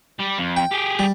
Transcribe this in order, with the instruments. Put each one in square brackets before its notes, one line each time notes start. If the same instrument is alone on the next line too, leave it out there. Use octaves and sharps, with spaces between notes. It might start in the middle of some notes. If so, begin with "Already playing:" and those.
[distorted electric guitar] G3 G4
F2
[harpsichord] G5
[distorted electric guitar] G4 G#4
[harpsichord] G3